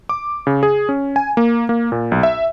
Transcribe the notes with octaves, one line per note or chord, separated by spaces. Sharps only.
D6
C#3
G#4
C#4
G#5
A#3
A#3
A#2
B1
E5